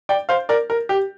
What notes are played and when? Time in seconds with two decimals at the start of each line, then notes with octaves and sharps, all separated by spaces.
0.09 D5 G5
0.29 C5 F5
0.49 A#4 D5
0.70 A#4
0.89 G4